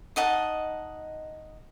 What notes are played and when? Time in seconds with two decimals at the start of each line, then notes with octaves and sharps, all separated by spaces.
0.16 D#4 D#5 F#5 A5